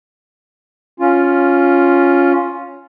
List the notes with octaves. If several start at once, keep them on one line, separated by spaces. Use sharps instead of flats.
C#4 F4